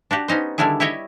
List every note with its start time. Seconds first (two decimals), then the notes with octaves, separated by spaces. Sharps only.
0.11 D4 F#4 G4
0.28 B3 C#4 D#4 C5
0.58 D3 D#3 G3 D4 E4 G#4
0.80 E4 G4 C#5 D#5 E5